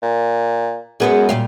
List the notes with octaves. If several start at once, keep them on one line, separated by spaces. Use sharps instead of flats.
A#2
F#2 G#3 B3 G#4
A#2 G3 F5